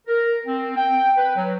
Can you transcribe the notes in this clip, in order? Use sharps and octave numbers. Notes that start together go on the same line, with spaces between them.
A#4
C4
G5
B4
F#3